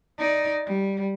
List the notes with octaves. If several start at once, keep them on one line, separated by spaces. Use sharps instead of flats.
D#4 D5
G3